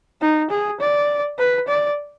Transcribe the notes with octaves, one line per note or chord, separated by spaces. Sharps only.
D#4
G#4
D5
B4
D5